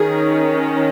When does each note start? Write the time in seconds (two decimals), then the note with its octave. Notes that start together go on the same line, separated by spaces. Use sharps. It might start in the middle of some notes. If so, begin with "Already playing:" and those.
Already playing: D#3 C#4 G#4